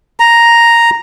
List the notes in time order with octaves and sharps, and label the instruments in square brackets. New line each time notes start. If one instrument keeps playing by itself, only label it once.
[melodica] A#5